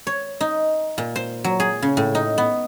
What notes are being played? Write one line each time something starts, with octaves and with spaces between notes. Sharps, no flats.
C#5
D#4
A#2
C5
F#3
G#4
C#3
A2
D#4
B3